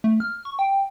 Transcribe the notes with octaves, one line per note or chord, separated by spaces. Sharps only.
A3
F6
C#6
G5